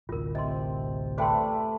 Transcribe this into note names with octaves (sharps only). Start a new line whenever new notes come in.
A1 D2 F4 A#4
C3 D#5 C6
A3 B4 C5 D5 G5 C6